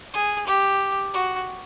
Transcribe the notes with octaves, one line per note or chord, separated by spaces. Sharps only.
G#4
G4
F#4